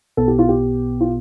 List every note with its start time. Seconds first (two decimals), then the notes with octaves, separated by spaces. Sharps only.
0.17 B1 B2 B3 A4
0.28 G4
0.39 F4
0.49 G4
1.01 F4